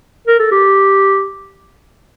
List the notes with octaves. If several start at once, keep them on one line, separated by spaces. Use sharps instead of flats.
A#4
A4
G4